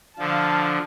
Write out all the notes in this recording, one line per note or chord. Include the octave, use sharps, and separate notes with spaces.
D3 F3 F5 A5